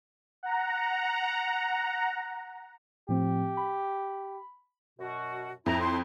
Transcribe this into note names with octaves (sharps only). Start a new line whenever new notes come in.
F#5 A#5
A2 F3 C4 G4
B5
F#2 B2 F#4
F2 E4 A#5
A2 E4 C6